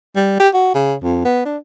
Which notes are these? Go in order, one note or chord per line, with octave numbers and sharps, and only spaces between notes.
G3
G4
F#4
C#3
F2
B3
D4